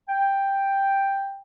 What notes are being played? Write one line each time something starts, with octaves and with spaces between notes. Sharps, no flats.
G5